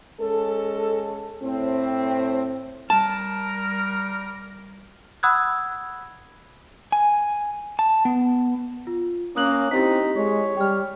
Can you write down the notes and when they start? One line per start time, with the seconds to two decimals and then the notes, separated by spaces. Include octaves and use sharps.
0.21 G#3 C#4 A4
1.43 A2 C4
2.90 G3 A#4 A5
5.23 F#5 B5 D#6 E6 F#6 G#6
6.92 G#5
7.79 A5
8.05 B3
8.87 F4
9.36 A#3 C#4 D#6 F#6 F#7
9.71 C4 D#4 E4 G4 B6
10.16 G#3 C#5
10.57 G3 G5 F6